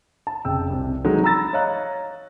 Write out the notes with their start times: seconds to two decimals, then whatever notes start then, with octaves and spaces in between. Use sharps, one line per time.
0.27 A5
0.45 F1 C#3 G5 E6
0.70 C2 C3
1.04 D#3 E3 F#3 G#3 A3 D#4
1.24 A#5 B5 E6 A6 A#6
1.53 C#5 D#5 F5 A#5 F#6